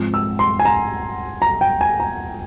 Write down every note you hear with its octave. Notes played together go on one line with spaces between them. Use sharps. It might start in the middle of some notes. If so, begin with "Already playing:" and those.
Already playing: G#2 F3 C4
E6
C6
G#5
A#5
A#5
G5
G#5
A#5